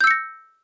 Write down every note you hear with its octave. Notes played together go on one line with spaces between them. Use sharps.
E6 G6 A#6 C#7